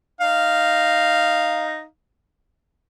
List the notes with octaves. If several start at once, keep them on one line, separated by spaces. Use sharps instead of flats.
D#4 F5